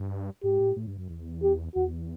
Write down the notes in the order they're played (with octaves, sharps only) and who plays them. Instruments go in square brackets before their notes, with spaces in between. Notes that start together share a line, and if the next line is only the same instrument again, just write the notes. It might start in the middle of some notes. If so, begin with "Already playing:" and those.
Already playing: [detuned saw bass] G2
[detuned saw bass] G#2 [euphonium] G4
[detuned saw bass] A2
A2
G2
F#2
E2
[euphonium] G4
[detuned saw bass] E2 [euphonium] F#4